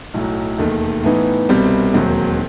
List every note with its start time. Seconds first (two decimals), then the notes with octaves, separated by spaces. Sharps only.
0.14 B1 A2 F#3
0.58 E1 D#2 D#3 A3
1.04 A2 E3 B3 D#4
1.49 C2 B2 G3 C4
1.93 E1 D#2 D#3 F#3 C4